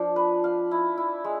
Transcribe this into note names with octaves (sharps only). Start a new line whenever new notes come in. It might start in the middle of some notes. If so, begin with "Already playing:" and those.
Already playing: F3 D4
B4
F5
E4
E4
G#3